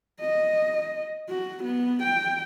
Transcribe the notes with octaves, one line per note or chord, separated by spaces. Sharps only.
D#5
F#4
B3
G5